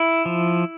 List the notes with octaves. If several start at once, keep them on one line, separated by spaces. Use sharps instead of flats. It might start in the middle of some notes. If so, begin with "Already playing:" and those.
Already playing: E4
F3